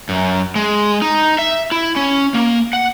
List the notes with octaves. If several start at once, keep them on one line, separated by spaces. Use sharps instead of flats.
F#2
G#3
D#4
E5
E4
C#4
A#3
F#5